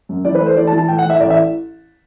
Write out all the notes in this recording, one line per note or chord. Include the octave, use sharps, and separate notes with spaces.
F#2
E3 D5
B4
A3 C5
E3 D5
A5
E3
A5
A2 G5
F#5
A2
E5
A1 D5
E5